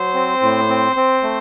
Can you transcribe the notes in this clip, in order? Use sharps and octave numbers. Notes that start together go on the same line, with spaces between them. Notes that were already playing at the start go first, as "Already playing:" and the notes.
Already playing: F#3 C5
C4
A2
C4
C4
A3